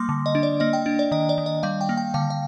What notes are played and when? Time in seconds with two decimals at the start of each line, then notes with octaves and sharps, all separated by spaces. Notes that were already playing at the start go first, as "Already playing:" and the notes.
Already playing: G3 A#3 C6 D6 D#6
0.09 D3
0.26 D#5
0.35 D4
0.43 D5
0.60 A#3 D#5
0.73 G5
0.86 D4
0.99 D5
1.11 D#3 D#5
1.29 D5
1.38 D#3
1.46 D#5
1.63 G3 F5
1.81 G5
1.89 A#3
1.97 G5
2.14 D3 F5
2.30 F5